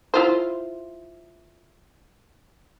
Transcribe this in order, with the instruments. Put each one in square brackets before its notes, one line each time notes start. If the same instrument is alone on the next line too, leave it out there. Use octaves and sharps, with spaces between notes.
[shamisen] E4 F4 C5